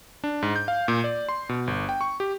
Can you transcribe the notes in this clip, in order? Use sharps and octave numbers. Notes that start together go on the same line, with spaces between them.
D4
G#2
G6
F5
A#2
D5
C6
B2
G1
G5
C#6
G4